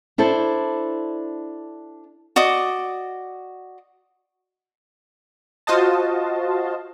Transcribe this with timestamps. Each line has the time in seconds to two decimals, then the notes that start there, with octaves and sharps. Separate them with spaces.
0.18 D4 E4 A4 C5
2.36 F#4 D5 D#5 D6
5.67 F4 F#4 C5 D#5 A5